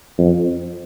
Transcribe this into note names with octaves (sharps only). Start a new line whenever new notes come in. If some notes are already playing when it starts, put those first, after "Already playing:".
F2